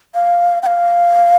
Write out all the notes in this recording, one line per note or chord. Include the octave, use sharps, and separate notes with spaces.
F5
G5
F5